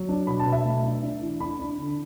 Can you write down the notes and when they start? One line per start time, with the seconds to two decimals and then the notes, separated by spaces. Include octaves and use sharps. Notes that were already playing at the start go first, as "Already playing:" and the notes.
Already playing: F#3
0.09 D4
0.27 B2 B5
0.40 A5
0.46 B2
0.52 E5
0.65 A3
0.83 D4
1.03 D4
1.21 E3
1.40 D4 B5
1.60 D4
1.78 D3